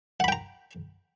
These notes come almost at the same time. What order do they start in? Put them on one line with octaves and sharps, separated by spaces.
F#5 B5 G5 A#5